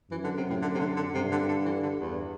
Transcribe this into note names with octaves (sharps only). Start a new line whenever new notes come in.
F#2 E3
D3
C3
A2
D3
C3
D3
D3
G2 C3
D3
D3
E3
D3
E2